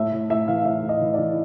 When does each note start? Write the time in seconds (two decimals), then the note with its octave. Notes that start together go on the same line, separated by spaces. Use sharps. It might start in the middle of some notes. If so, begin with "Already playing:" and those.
Already playing: A2 E5
0.12 A2
0.30 A2 E5
0.48 E3 F5
0.65 A2 E5
0.83 A2
0.89 D#5
1.01 E3
1.14 E3 D5